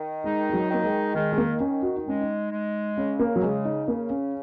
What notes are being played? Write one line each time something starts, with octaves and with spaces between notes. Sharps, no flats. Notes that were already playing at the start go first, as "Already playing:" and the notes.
Already playing: D#3
G#3 D#4
G#3
F#3
D#3 A#3
G#3
D#3 G#3
G#3
A#3
D#3 C#4
F#4
D#4
G#3 C#4
D#4
G#3
C#3 C#4
A#3
F#3
C#3 G#3
D#4
C#3 A#3
C#4